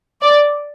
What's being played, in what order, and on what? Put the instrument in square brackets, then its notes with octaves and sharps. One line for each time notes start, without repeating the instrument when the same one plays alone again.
[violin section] D5